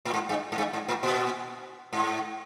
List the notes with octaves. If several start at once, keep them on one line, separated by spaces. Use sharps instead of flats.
A2
G#2
G2
G#2
G2
G#2
A2
A#2
G#2